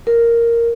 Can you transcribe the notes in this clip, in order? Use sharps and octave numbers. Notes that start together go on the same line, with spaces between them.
A#4